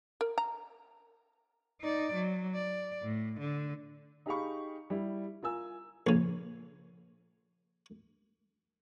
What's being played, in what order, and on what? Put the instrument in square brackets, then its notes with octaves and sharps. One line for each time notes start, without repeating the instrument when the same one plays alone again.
[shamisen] A#4
A#5
[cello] D#4 D5
F#3
D5
A2
D3
[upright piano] D#4 G4 G#4 F5 B5 C#6
G3 E4
F4 A#4 G#5 E6
[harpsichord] A#1 C#3